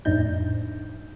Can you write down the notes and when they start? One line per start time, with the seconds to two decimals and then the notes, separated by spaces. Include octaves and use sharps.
0.05 F2 A2 D4 D#4 G6